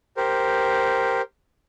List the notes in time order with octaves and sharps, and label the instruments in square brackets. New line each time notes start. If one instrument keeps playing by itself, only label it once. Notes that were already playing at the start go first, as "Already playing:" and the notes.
[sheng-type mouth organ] G4 A#4 C5